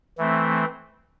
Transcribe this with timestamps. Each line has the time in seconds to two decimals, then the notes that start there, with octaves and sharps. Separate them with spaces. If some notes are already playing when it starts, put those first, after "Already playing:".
0.18 E3 A3 C4